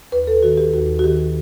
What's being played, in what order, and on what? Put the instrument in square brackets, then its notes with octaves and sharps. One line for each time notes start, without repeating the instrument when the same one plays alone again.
[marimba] D#2 B4
A4
D#3 F#4
G4
D#2 F#4
F#4
D#3 G4